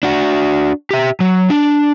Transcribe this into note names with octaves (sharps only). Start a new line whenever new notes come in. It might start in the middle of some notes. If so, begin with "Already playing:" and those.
D4 F#4
G4 E5
F#3
D4